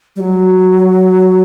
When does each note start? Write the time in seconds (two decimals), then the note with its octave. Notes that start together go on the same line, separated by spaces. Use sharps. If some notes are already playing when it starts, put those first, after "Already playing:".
0.16 G3
0.20 F#3